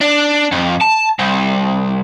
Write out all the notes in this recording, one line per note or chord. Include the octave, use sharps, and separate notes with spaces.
D4
F2
A5
C2